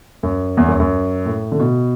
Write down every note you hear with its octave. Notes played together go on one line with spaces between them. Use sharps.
F#2
E2
F#2
F#2
A2
D3
B2